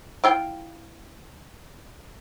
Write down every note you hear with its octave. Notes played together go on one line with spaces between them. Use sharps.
E4 F4 G5